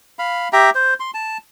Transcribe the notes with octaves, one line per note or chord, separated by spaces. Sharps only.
F5 B5
G4 E5 G5 A#5
C5
C6
A5